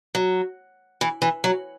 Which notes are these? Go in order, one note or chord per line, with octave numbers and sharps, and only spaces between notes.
F#3
E3
E3
F#3